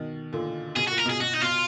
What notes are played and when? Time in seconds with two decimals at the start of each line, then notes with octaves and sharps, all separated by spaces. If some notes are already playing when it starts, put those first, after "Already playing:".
Already playing: B2 D#3
0.33 A#2 D3
0.76 B2 G#4
0.88 A#2 F#4
0.98 A#4
1.05 B2
1.10 G#4
1.21 B2 F#4
1.34 D#4
1.42 B2 F4